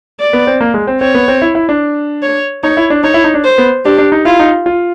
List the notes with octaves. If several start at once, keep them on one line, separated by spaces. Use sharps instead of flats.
D5
B3
C4
A#3
G#3
C4
C4 C#5
B3
C4
E4
E4
D4
C#5
D#4 C#5
E4
D4
D#4 C#5
E4
D#4
D4
C5
B3
D4 G4
D4
D#4
E4 F4
D#4
F4